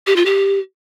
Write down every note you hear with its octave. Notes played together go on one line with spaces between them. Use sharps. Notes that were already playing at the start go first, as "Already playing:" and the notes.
G4
F4
G4